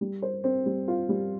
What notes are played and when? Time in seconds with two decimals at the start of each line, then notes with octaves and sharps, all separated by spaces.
0.01 G3
0.22 C5
0.44 C4
0.66 G3
0.88 F4
1.09 G3